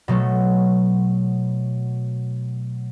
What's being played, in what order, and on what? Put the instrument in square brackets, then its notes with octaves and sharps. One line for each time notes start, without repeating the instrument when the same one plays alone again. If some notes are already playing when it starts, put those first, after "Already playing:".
[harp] B2 F#3 A3